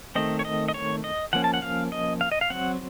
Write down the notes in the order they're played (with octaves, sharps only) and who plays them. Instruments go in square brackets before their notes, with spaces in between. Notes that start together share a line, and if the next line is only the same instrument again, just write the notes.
[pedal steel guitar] D#3 A3 C4 D#5
C#5
D#5
D#5
C#5
D#5
F3 A#3 C#4 F#5
A5
F#5
F5
D#5
F5
D#5
F5
F#3 C4 F#5